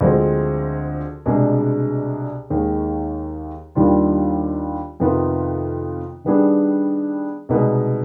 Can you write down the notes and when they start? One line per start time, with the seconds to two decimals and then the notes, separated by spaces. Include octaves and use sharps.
0.01 D2 D3 F3 G#3 C4
1.26 C2 B2 G#3 D4 G#4
2.50 D#2 D#3 G#3
3.75 D#2 D#3 G3 D4 F4
5.00 F2 C3 D#3 B3 F4
6.24 D#3 G3 B3 D4 G#4
7.49 C2 B2 G#3 B3 D#4